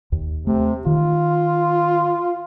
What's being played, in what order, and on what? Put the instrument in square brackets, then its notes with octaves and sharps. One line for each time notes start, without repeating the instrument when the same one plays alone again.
[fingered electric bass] D#2
[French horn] C3 [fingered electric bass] A3
[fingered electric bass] D#3 [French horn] F4